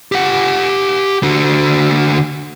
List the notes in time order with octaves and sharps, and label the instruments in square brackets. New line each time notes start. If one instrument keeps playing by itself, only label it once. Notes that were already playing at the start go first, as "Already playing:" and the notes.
[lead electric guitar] G4 F#5
D3 F#4